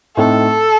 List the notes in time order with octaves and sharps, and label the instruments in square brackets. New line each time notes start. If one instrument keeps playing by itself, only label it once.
[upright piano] A2 A3 C4 D#4 [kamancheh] A4